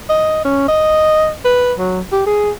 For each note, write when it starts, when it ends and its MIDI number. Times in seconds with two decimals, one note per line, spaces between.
0.09 0.43 75
0.45 0.66 61
0.68 1.31 75
1.45 1.73 71
1.78 2.00 54
2.12 2.24 67
2.26 2.51 68